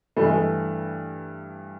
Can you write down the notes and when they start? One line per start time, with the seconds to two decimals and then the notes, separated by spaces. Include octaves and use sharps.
0.17 G2 E3 A3
0.24 G#3
0.33 A3